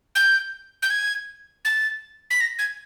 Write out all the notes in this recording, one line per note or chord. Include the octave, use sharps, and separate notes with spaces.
G6
G6
G#6
A6
B6
A#6
G#6